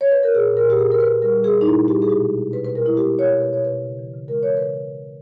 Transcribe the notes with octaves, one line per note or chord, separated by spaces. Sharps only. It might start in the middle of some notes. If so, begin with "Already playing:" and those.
C#5
B4
A#4
A#2 G#4
A#2
A#4
A#2
G4
A#2 G#4
A#2 A#4
B4
A#2
G3 A#4
G3
G#4
A#2
D#4
A#2 E4
G3
G4
G3
G#4
B2 G4
G#3
B2
B2 B4
B2 B4
A#4
G#3 E4
G#3 G4
B2
C#5
B2
B2 B4
B2 C#5
B4
B2
C#3
E3
C#3
G#3 A#4
E3 C#5
C#3 B4